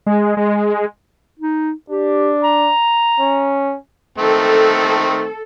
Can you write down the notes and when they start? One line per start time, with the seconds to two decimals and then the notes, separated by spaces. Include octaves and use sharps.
0.06 G#3
0.37 G#3
1.39 D#4
1.90 D4 G4
2.44 A#5
3.20 C#4
4.18 D#3 A3 C4 A4